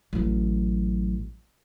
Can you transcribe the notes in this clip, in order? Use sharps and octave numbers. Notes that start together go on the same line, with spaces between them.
A1 F#3